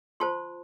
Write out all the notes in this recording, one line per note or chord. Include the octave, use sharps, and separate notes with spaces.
F4 C5 A5 C6